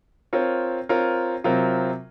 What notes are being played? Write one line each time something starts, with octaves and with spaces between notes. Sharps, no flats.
C4 F4 A#4 C#5
C4 F4 A#4 C#5
C3 F#3 C4 F4 A#4